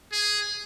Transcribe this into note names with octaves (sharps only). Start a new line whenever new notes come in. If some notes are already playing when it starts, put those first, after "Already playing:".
G#4